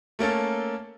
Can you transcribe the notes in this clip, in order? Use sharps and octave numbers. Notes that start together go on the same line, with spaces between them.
A3 A#3 C#4 A4